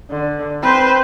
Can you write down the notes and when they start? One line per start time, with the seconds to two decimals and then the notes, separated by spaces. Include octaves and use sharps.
0.10 D3
0.63 C4 B4 C5